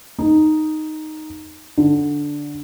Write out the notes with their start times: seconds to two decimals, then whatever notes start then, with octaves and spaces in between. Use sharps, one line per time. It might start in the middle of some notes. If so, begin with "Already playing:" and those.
0.19 D#4
1.78 D3